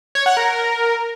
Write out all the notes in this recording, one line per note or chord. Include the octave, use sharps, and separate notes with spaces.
C#5
F#5
A#4